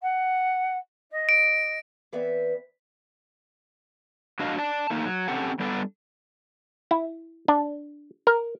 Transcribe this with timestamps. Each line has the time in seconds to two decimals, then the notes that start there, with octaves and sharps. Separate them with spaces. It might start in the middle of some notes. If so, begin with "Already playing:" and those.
0.02 F#5
1.11 D#5
1.29 D7
2.12 E3 B3 C4 B4 D5 E5
4.39 F#3 D4 F#4 D#5 F5
4.58 D5 A5
4.90 A3 A#3 D#4
5.05 F#3
5.28 C4 C#4 G4 A4 F#5
5.60 G3 B3 D4 A4 D5
6.91 E4
7.48 D4
8.27 A#4